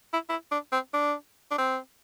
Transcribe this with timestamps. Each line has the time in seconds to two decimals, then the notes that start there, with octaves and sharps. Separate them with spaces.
0.13 E4
0.29 E4
0.51 D4
0.72 C4
0.94 D4
1.51 D4
1.58 C4